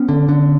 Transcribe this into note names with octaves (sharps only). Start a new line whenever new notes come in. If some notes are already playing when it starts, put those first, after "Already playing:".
Already playing: B3 C#4
D3
D3